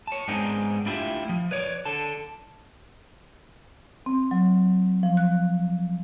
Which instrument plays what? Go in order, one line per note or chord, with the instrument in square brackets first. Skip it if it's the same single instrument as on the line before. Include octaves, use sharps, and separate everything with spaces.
[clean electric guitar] C#5 A5
G#2 B3 C4 D4 D#4 G#4
A3 D4 E4 F4 G4 E5
F3
B4 C#5 D5
D3 A4 A5
[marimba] C4
F#3
F3
F#6